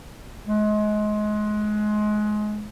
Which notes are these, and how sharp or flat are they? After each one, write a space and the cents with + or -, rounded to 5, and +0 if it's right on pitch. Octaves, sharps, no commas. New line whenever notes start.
G#3 +25